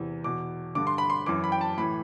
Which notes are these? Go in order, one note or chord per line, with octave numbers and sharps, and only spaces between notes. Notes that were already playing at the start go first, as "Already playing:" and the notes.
Already playing: E2 C3 E3
E2 B2 D6
G2 D3 D6
C6
B5
C6
F#2 E3 D6
B5
G5
A5
A2 E3 B5